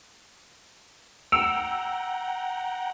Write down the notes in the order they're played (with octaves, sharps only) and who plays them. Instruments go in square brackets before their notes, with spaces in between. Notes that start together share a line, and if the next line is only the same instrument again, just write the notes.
[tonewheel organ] F#5 G5 A#5 [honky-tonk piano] E6